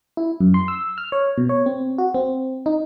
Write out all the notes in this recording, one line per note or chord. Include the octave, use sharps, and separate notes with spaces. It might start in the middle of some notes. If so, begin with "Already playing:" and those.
E4
F#2
C6
E6
F6
C#5
B2
C#5
C4
F#4
C4
D#4